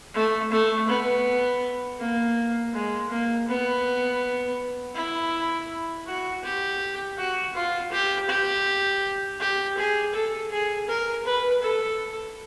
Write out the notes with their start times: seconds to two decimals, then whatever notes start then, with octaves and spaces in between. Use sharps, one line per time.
0.15 A3
0.52 A3
0.89 B3
2.00 A#3
2.74 G#3
3.10 A#3
3.48 B3
4.96 E4
6.07 F#4
6.44 G4
7.18 F#4
7.55 F4
7.92 G4
8.29 G4
9.40 G4
9.78 G#4
10.14 A4
10.51 G#4
10.88 A#4
11.25 B4
11.62 A4